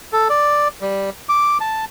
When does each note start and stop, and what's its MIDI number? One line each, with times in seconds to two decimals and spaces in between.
0.13 0.28 69
0.29 0.68 74
0.81 1.10 55
1.29 1.58 86
1.60 1.85 81